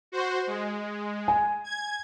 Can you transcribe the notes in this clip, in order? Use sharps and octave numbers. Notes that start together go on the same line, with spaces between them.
F#4 C5
G#3
G#5
G#6